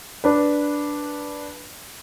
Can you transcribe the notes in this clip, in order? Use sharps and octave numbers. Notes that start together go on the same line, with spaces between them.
D4 B4